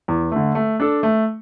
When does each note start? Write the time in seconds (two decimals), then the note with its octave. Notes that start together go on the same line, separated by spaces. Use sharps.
0.08 E2
0.32 D3 A3
0.55 A3
0.80 D4 A4
1.03 A3